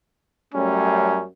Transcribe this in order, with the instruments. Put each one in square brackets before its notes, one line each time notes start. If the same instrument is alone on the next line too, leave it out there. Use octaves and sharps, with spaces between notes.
[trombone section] F#2 G3 A3 [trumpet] C#4